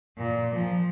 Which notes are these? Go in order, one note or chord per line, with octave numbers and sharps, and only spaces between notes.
A#2
F3